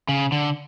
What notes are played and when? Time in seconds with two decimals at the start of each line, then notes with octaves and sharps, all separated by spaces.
0.09 C#3
0.32 D3